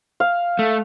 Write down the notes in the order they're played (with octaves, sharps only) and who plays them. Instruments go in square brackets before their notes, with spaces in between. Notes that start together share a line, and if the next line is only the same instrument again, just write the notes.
[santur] F5
[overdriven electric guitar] A3